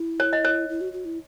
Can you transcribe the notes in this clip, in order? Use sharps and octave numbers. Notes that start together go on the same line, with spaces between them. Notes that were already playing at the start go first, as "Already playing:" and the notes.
Already playing: E4
C#5
D#5
C#5
E4
F#4
F#4
E4